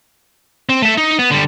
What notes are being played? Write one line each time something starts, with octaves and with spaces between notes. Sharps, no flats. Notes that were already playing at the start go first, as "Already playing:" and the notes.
C4
A3 E5
D#4
B3
D3 G3